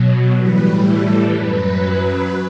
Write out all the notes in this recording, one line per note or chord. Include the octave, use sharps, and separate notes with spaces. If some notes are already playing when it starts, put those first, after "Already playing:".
Already playing: B2 F#3
A2 E3 G3 B4
A4
F#2 F#3 B4